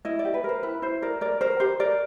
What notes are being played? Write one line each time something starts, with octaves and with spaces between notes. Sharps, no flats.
E4 D#5
D5
G4
B4
A#4 C5
E4 B4
E4 C5
A#4 D5
A#4 D5
A#4 C5
G4 C5
A#4 D5